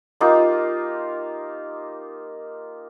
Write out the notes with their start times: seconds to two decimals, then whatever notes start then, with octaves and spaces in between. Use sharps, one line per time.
0.21 A#3 D#4 F4 G4